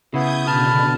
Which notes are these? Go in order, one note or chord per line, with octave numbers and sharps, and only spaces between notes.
C#3 B3 E4 D#6 G6 G#6
B2 D3 A5 B5 F6